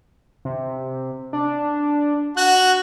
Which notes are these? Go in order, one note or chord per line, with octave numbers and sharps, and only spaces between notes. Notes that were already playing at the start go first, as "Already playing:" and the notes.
C3
D4
F#4 F#6